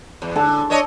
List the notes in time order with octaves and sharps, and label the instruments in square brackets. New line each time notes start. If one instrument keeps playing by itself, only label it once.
[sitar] E2
[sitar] D3 [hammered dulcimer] A4
[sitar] D4 C#5 D#5